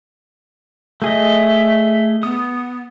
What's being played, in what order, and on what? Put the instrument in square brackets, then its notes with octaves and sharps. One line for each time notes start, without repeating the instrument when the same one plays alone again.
[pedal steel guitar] A3 G#4 D#5 [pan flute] E5
[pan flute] B3 [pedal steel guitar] D#6